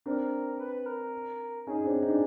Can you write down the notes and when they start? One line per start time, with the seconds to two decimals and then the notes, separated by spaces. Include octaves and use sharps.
0.06 C4 D4 A#4
0.59 B4
0.86 A#4
1.67 C#4 D#4 G#4
1.84 C4 D4
2.03 D#4
2.10 D4